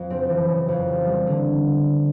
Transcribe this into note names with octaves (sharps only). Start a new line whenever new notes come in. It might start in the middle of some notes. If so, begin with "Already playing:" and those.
Already playing: F2
F#1 C4
E3
C#3
F2
F1
G3
D3